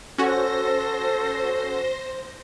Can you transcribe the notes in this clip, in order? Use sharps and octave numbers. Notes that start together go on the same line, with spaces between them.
C#4 F#4 A4 C5 A#6